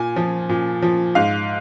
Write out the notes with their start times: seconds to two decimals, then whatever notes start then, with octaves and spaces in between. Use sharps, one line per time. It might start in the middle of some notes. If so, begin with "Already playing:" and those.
Already playing: A#2 G#5
0.16 F3
0.49 A#2
0.82 F3
1.15 G#2 F5